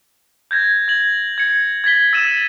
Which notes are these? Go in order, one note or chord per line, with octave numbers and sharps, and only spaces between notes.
G6 G#6 A#6
G#6 F#7
G#6 C#7
G#6 A6 B6 G7
E6 A6 D#7 E7